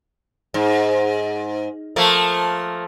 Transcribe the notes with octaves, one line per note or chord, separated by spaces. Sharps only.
G#2
F3 A3 A#3